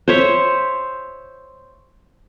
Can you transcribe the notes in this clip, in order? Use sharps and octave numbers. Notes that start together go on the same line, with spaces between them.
C5 C#5 E5